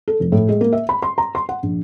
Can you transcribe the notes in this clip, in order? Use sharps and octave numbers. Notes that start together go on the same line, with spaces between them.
A4
F1
A2
G#3
A#3
E5
B5
C6
A#5
C6
F#5
A#1